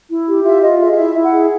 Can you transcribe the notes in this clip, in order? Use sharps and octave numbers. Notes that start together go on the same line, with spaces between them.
E4
G4
F4 E5
F4 D#5
G#4 E5
F5
E4 E5
E4
F#5
G#4